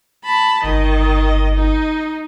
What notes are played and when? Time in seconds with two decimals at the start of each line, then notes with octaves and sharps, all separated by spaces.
0.24 A5 B5
0.64 G1 D#3 D#5
1.55 D#4